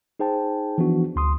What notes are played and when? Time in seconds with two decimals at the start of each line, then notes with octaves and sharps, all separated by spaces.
0.19 D#4 G#4 C5 G5 A5
0.78 E3 F3 B3 D4 F#4
1.16 D2 C6 D#6